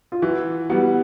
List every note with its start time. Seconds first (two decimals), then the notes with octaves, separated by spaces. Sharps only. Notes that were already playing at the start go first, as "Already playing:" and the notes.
0.12 F4
0.22 E3 F#4
0.70 G3 B3 F#4